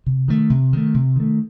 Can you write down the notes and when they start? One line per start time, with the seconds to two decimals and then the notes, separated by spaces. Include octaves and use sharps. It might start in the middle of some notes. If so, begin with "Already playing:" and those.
0.06 C3
0.28 D#3 A3
0.50 C3
0.73 D#3 A3
0.94 C3
1.16 D#3 A3